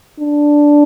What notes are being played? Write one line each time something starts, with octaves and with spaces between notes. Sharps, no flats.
D4